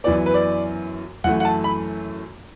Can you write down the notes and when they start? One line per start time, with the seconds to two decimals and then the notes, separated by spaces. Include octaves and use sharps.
0.04 F#2 E3 B3 D5
0.26 B4
0.34 D5
1.24 F#2 E3 A3 F#5
1.40 F#5
1.45 A5
1.64 B5